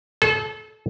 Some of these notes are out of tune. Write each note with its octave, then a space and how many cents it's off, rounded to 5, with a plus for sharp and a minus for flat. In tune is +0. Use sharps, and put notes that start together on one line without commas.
A4 -30